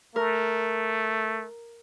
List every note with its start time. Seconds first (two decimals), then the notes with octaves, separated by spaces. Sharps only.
0.16 A3 A#4